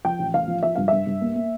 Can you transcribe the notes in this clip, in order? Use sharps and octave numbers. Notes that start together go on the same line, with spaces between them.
F3 G5
A1
A1 F5
F3
F3 E5
G2 F5
G2 E5
G2
A#3
A#3